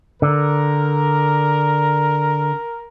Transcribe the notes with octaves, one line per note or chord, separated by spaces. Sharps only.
D3 A#4